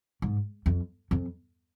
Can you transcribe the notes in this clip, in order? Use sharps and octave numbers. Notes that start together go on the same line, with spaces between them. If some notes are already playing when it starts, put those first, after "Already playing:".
G#2
F2
F2